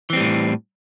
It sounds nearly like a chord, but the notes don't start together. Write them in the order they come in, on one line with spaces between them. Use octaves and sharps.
E3 C4 G3 A2